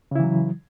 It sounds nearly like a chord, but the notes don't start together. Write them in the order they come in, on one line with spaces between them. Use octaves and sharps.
C#3 E4 E3 F#3